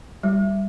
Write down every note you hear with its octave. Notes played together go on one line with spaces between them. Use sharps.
G3